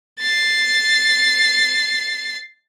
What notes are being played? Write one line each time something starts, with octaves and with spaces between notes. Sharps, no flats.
A6 C7